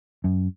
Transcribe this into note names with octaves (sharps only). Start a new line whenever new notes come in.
F#2